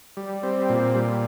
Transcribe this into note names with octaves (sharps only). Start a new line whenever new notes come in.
G3
C4
A#2
G3